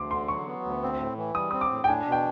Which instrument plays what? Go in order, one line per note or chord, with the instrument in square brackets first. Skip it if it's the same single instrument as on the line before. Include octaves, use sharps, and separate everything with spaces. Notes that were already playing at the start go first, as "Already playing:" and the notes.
Already playing: [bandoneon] D2 [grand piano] C6 D6
[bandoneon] D3 [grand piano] C6
[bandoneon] F#3 [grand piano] C#6
[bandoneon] B3
D2
C4
A2
E3
[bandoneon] G3 [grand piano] D#6
[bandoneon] C4 [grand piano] D#6
[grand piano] D6
[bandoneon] A2
[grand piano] G5
[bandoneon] D4 [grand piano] G#5
[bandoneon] B2
[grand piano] G5